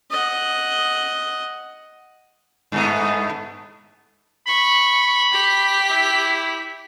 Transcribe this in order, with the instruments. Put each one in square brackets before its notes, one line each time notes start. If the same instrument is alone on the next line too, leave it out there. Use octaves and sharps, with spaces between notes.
[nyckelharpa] D#5 F#5
[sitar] G2 A3 B3
[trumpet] B5 [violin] C#6
[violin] G4 B6
[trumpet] E4